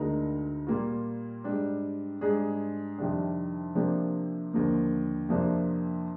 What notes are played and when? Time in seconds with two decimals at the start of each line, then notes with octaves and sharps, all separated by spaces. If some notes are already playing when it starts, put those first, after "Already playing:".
Already playing: D2 D3 G#3 D#4 A#4
0.67 A#2 G3 A#3 F4
1.44 G#2 G3 D4
2.21 G#2 G3 D4 G#4
2.98 F2 C3 D#3 G3 D4
3.75 C3 F3 A#3 D4 G4
4.53 D#2 D3 F3 A#3
5.29 F2 C3 F3 A#3 D4